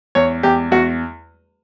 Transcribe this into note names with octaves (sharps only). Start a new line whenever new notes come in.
E2 C#5
E2 G4
E2 F#4